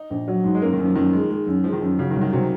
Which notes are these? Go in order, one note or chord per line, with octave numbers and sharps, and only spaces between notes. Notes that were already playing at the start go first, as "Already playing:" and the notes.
Already playing: D#4
A#1
F#3
G#2
G#3
F#2 A#3
D#3
F#2
F3
F#2 D#3
G#3
G#3
F#2
F3 G#3
D#3
F#2 F3
C#3 F#3
D#3
C2
D#3
C3 F#3